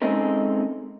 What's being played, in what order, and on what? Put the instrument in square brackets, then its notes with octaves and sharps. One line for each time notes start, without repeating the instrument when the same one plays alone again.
[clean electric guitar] G#3 A3 C4 C#4 D#4 A#4